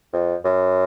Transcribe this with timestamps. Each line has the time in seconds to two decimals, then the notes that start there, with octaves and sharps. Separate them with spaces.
0.13 F2
0.45 F#2